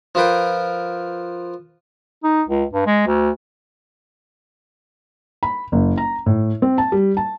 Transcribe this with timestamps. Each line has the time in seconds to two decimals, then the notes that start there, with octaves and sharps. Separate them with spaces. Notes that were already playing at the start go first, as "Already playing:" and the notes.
0.15 F3 F4 A#4 B4 G5
2.24 D#4
2.48 C#2
2.73 G2
2.87 G#3
3.07 D2
5.43 B5
5.72 F#1
5.97 A#5
6.26 A2
6.62 C4
6.78 A5
6.92 G3
7.17 A5